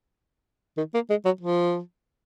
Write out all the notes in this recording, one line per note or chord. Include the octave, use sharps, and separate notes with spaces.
D#3
A#3
G#3
F#3
F3